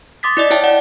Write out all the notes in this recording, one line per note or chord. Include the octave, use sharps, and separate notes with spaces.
C6 D6 D#6 A6 B6
E4 D5 D#5
E4 C#5 E5 G5 A5
D5 F#5